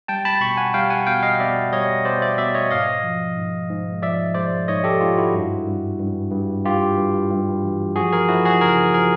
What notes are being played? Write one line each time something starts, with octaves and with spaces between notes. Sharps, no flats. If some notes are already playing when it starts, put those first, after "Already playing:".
G3 G5 A5
A5 B5
B2 B5 C#6
F#5 G#5
G3 F5 G5
F#5 G#5
B2 F5 G5
D#5 F5
B2 D5 E5
G3 C#5 D#5
B2 C5 D5
D5 E5
B2 D5 E5
C#5 D#5
G#2 D#5 F5
F3
G#2
G#2
F3 D5 E5
G#3 C5 D5
G#2 C#5 D#5
G4 A4
G#2 F4
E4 F#4
G2
G2
G2
G2
G2 F4 G4
G2
G2
E3
F3 F#4 G#4
G#4 A#4
F3 E4 F#4
F#4 G#4
C#3 G#4 A#4
F3 G#4 A#4